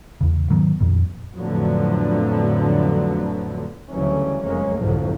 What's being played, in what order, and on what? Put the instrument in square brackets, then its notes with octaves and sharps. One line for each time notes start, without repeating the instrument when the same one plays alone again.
[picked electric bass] E2 C#3
G#2 D#3 F#3 B3
F2 A#2
[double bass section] F2 A2 D3 F3 F#3 B3
D2 C#3 E3 F#3 G3 C#4
F1 F#2 G#3 A#3 C#4
C2 F2 G#2 D3 F3 F#3